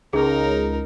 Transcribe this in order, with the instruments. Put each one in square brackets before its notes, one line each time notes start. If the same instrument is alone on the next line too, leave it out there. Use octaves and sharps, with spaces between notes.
[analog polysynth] C#2 [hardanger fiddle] D#4 A#4 [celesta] G#4